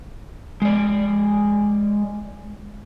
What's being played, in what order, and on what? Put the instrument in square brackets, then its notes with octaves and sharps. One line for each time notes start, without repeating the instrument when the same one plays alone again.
[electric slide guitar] G#3 D5